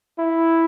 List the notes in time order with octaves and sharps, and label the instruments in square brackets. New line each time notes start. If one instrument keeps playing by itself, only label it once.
[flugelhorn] E4